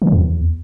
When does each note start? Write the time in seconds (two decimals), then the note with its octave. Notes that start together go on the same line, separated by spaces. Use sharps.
0.02 D3
0.07 E3
0.13 E2